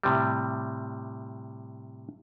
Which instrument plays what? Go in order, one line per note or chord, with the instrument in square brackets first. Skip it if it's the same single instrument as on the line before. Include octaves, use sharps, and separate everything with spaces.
[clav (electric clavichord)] A2 C3 G3